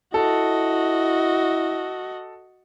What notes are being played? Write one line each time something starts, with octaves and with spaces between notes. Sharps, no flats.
E4 F#4 A4 D#5